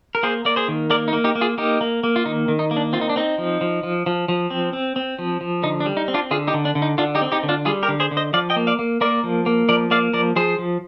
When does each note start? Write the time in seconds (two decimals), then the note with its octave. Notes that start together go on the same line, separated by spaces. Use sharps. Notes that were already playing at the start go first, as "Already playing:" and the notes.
0.15 A#4
0.23 A#3 G#4 C5
0.45 A#3 D5
0.56 G#4 C5
0.68 D#3
0.90 A#3 A#4 D5
1.08 D#4
1.13 A#3
1.24 D#4 G4
1.35 A#3
1.41 F4 G#4
1.58 A#3 D#4 G4
1.81 A#3
2.03 A#3
2.16 F4
2.26 D#3 D#4
2.48 D#3
2.59 D#4
2.71 A#3
2.77 D4
2.93 C4 F4
3.01 D#4
3.09 D4
3.16 C4 D#4
3.38 F3
3.61 F3
3.83 F3
4.06 F3
4.28 F3
4.50 C4
4.73 C4
4.96 C4
5.19 F3
5.41 F3
5.63 D3 D#4
5.80 D4
5.86 G3
5.97 D#4
6.08 C4
6.14 D4 F4
6.31 D3 F4 G#4
6.47 D#4 G4
6.54 D3
6.65 D4
6.75 D3
6.82 D#4
6.98 D3 D4 F4
7.15 D#4 G4
7.21 C4
7.32 D#4 G4
7.43 D3
7.49 D4 F4
7.65 G3 F4 G#4
7.83 G4 A#4
7.88 D3
8.00 G#4 C5
8.11 D3
8.17 C5 D#5
8.33 F3 D5 F5
8.50 D#5 G5
8.56 A#3
8.67 D5 F5
8.79 A#3
9.01 A#3 A#4 D5
9.23 F3
9.46 A#3
9.69 F3 A#4 D5
9.91 A#3 D5 F5
10.13 F3 A#4 D5
10.36 F3 G#4 C5
10.59 F3